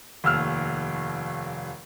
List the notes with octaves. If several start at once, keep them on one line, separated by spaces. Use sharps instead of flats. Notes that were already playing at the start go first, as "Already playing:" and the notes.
F1 D#2 E6 F6